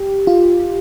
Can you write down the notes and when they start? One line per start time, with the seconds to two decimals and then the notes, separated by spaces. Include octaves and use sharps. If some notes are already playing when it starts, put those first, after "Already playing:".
Already playing: G4
0.27 F4